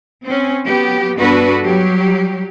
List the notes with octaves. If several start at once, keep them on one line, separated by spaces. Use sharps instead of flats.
C4 C#4
F#3 B3 G4
G2 B3 D4 F#4 A4 B4
F#3 G3 G4